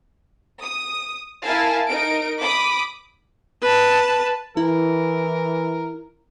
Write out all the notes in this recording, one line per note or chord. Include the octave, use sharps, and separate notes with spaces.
D#6
E4 A#4 F5 G#5 A5
D#4 A#4 D7
B5 D6 D#6
B4 A5
E3 E4 A#4